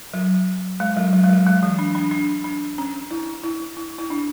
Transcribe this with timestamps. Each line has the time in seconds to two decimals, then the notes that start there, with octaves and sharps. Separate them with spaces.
0.14 F#3
0.80 G#3
0.97 F#3
1.13 F#3
1.24 G#3
1.29 F#3
1.46 G#3
1.63 E3
1.79 D4
1.95 D4
2.11 D4
2.44 D4
2.78 C#4
3.11 E4
3.44 E4
3.77 E4
3.98 E4
4.10 D4